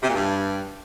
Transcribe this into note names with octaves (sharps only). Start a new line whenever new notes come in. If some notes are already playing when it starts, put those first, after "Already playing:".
C3
A#2
G2